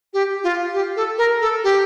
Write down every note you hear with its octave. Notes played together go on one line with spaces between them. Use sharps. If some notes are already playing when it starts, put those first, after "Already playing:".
G4
F4
G4
A4
A#4
A4
G4